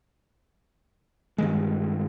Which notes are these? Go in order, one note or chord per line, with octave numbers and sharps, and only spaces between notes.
G2 D#3 G#3